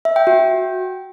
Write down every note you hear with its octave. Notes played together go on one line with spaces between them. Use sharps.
E5
G5
F#4